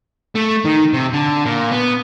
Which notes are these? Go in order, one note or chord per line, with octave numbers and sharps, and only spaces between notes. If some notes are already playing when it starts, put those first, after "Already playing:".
A3
D#3
C3
D3
A#2
B3